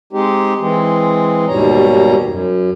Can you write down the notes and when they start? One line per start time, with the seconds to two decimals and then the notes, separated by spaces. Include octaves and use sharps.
0.13 G#3 C4 D#4 G4
0.60 E3 G#3 C4
1.48 D#2 G#2 B2 G3 C#5 A#5
2.25 F#2